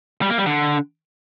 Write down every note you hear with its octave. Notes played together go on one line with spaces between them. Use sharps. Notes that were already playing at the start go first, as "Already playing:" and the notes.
G3
A#3
G3
D3